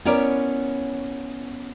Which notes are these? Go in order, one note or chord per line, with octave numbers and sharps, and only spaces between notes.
B3 C#4 E4 A#4 C#5 D5